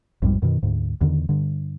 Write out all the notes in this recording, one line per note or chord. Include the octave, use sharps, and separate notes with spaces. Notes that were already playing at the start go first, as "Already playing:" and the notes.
A#1 F2 G#2 G3
F#2 B2 D#3
D2 G#2
E2 D3 D#3
G2 D3